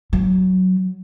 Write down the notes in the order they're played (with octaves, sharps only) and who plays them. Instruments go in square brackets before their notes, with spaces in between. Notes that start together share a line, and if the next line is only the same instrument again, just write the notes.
[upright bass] F#3